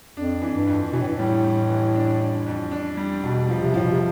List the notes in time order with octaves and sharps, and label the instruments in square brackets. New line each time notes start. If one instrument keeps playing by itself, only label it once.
[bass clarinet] F2 [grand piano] D4
[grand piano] E3
[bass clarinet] G2
[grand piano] F2
[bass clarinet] B2 [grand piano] E3
[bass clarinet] A2
G2
[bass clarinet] A2 [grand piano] G3
[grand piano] G3
E3
D4
D4
F2
D4
G3
[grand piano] E1 [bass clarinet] B2
[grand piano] F3
[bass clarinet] C3
[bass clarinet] A2 [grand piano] F3
[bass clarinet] B2
C3